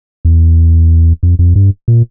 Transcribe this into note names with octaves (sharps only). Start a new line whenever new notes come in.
E2
F2
F2
G2
A#2